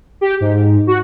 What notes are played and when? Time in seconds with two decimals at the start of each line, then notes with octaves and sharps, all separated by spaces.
0.21 G4
0.40 G#2
0.87 F#4